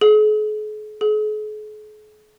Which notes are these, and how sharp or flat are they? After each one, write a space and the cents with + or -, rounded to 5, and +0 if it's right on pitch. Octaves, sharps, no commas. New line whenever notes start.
G#4 +45
G#4 +45